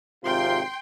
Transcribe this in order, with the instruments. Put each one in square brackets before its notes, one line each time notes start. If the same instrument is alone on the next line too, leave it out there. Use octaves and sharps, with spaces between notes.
[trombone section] G#1 C3 F4 [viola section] G5 C6